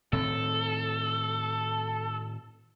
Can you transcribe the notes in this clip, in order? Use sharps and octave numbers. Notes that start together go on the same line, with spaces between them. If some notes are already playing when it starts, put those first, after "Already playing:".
A2 D#3 C4 A4